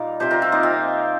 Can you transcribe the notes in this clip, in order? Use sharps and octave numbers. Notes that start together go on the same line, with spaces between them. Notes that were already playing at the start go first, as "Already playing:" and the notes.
Already playing: A#2 G3 D#4 F4 A#4
C3 F3 G4 C5
F4 A#4
C4 F4
A#3 D#4
C4